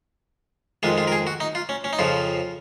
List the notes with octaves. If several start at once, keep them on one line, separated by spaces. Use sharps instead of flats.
F2 D#3 G#3 F4
F4
A#4
G#4
F#4
D#4
F4
C#4
C#4
D#4
F2 C#3 F3 F4